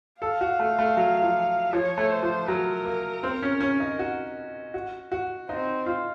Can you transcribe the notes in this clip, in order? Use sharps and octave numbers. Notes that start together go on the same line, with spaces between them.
A4 F5
F#4
A3
A3
F#3
F3
F3 C#5
A3
C5
F3
F#3 A#4
A#3
C4
C#4
C#4
D#4
F#4
F#4
F#4
C4 D#4
F4